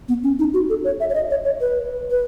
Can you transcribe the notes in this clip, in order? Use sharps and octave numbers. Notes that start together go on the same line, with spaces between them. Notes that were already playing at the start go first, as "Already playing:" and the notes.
B3
C#4
D#4
F#4
A4
C#5
E5
C#5
D#5
C#5
C#5
B4
B4